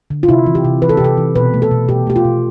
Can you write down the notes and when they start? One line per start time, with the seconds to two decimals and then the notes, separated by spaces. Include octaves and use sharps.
0.10 D3
0.23 F4
0.28 C3 E4
0.46 E3
0.55 G4
0.65 C3
0.82 E3 B4
0.89 A4
0.97 G4
1.00 C3 A4
1.17 E3
1.35 B2 B4
1.54 A3
1.62 A4
1.71 B2
1.88 B2 G4
2.07 A3 G4
2.16 F4
2.25 B2